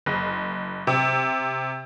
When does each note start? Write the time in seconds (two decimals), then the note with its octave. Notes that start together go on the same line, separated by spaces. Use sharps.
0.06 F#1
0.87 C3